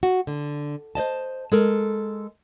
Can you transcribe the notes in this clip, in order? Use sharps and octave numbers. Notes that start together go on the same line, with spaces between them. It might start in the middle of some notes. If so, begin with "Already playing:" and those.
F#4
D3
C5 D5 D#5 A5
G#3 A4 A#4